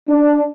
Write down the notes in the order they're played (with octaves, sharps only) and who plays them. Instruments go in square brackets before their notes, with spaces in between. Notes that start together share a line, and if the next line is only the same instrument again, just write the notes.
[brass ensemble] D4